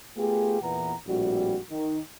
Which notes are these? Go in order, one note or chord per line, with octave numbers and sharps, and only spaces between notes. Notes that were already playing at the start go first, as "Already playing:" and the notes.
A3 B3 F4 G4 G#4
E2 A#2 E3 B3 F#5 A#5
A#1 A2 G3 C4 F#4
D#3